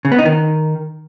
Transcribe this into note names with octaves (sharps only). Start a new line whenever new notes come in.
C#3
B3
D#4
D#3